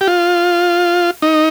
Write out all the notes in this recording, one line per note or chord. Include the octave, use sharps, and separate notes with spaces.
G4
F4
D#4